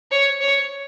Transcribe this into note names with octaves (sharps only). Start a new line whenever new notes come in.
C#5
C#5